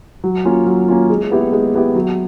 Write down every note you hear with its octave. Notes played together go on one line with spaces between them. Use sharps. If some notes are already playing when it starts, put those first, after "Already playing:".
F#3
A#3 C#4 F4
F#3
A#3 C#4 F4
G#3
B3 E4 G4
G#3
B3 E4 G4
F#3